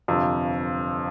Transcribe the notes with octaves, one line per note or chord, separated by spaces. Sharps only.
G1 F2 C3